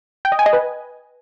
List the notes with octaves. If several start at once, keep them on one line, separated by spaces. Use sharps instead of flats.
G5
D#5
G#5
D#5
B4